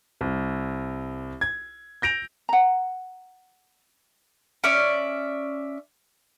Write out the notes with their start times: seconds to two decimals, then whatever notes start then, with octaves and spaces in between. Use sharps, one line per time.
0.21 C2
1.41 G#6
2.02 G6 A#6 D7 F7
2.49 F#5 A#5
4.64 C#4 D5 E5